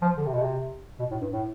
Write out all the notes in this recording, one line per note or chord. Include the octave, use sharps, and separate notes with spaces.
F3
D3
C3
B2
C3
B2
A2
G2
A2